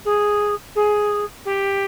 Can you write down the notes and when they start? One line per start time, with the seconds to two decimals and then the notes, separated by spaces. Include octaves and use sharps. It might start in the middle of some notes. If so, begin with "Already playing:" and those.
0.04 G#4
0.75 G#4
1.45 G4